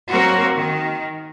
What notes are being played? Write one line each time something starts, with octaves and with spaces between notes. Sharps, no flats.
F#3 A#3 C4 F#4 A#4
D#3